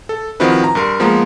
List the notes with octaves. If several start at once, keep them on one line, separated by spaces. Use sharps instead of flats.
A4
D#3 F3 C4 E4 F#4 B4
A#5
G2 A#4 C6
F3 G#3 A#3 B3 A#5 C6